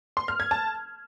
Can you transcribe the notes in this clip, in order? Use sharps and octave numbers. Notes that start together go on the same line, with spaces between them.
C6
F6
G#6
A5